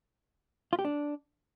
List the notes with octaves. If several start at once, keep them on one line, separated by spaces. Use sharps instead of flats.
F4
G4
D4